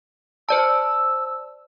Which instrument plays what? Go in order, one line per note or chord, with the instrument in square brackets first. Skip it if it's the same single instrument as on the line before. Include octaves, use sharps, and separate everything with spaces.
[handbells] C5 D5 A5 [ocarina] E6